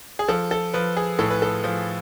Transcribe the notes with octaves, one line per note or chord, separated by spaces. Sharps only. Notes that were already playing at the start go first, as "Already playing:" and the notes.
G#4
F3 A4
A4
F3 B4
G#4
A2 A4
B4
A4
F3